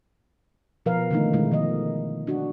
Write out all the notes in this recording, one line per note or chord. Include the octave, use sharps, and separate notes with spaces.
B2 F3 A#4 B4 F5
D3 D#3 F3 A3 A#3 D#4
B2 D#3 G#3 E4
D#3 F3 D#5
D4 F#4